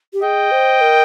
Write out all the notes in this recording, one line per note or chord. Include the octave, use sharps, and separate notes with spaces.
G4
G#4 D#5 G5
C5
A#4